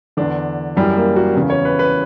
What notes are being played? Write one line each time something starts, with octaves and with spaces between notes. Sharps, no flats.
E2 D3 D4
F#2 E3 G3
A#3
F#4
E2 C#3 E3
C#5
B4
B4